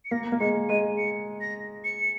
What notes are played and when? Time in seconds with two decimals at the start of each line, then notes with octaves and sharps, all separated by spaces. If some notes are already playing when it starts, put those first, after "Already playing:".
0.05 C#7
0.11 A#3 A#6
0.32 A#3
0.40 G#3 C#7
0.69 G#3 D#7
0.98 C#7
1.41 A#6
1.84 C#7